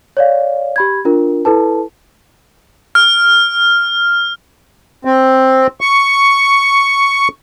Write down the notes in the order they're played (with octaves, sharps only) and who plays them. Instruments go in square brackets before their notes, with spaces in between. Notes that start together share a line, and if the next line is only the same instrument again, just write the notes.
[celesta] C#5 D5 F5
G4 B5 G#6
D4 F4 A#4
E4 A4 B4 A5
[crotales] F6
[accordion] C4
C#6